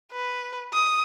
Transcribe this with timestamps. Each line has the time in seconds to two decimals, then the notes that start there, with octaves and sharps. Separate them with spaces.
0.12 B4
0.73 D#6